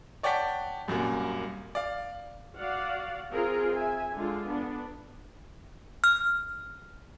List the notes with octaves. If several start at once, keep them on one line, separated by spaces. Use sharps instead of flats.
C#5 D5 F#5 G5 A5 B6
C2 F#2 A#2 A#3
D5 F5
F#4 D5 F5 F#5
C4 F4 G#4 A#4
E5 G#5
D3 G#3 F4
B3 D4
F6